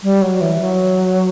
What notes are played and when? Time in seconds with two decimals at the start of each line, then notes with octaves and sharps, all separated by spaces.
0.03 G3
0.22 F#3
0.41 E3
0.61 F#3